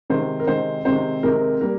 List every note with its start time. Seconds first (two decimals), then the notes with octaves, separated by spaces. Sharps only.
0.10 C3 D#3 G#3 C4 C5
0.40 A#4
0.47 C3 D#3 G#3 C4 C5
0.85 C3 D#3 G#3 C4 C5
1.23 C3 D#3 G#3 C4 A#4
1.61 G3 A#3 A#4